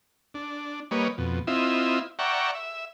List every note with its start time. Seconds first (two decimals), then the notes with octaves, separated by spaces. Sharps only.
0.34 D4
0.91 G3 A#3 B4 C#5 D#5
1.18 F2 B2
1.47 C4 E4 F4 D#5 E5
2.19 D5 E5 F#5 G5 A#5 C#6
2.55 E5